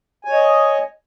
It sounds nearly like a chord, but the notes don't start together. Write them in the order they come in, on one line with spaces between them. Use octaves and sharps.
G#5 C#5 D#5